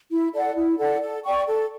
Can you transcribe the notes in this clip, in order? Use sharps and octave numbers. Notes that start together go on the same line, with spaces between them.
E4
A4 D5 F#5
E4
A4 D5 F#5
A4
D5 G5 C#6
A4